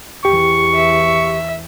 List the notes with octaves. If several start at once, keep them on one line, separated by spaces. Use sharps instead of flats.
E2 E3 G4 C#6
E5